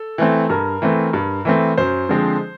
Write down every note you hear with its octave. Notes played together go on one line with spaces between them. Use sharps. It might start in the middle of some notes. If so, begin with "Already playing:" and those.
Already playing: A4
E3 A3 C4
G2 A#4
E3 A3 C4
G2
E3 A3 C4
F#2 C5
D3 F3 G#3 C4